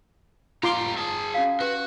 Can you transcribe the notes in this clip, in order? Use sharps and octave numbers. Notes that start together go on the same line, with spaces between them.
G3 F4 A#5 C6 D6
G#4 A5
C#4 F#4 F5
F#4 G4 B4